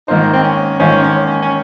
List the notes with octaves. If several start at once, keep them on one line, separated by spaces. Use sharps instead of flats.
G#2 D#3 A#3 D#4 F4 C5
C4
C#4
G#2 D#3 A#3 C#4 F4 C5
C#4
C#4
C#4